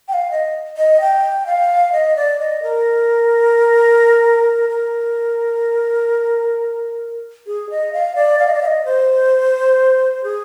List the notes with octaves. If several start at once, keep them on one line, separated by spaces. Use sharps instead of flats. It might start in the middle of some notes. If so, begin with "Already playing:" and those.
G5
F5
D#5
D#5
G5
F5
D#5
D5
D#5
A#4
A#4
G#4
D#5
F5
D5
F5
D#5
D5
F5
D#5
C5
G#4